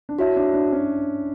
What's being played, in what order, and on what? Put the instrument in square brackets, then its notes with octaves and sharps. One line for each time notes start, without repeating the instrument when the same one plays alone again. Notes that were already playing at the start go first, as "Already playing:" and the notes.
[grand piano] D4
[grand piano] E4 [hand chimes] F#4 C#5 E5 A5
[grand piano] D4
D4
C#4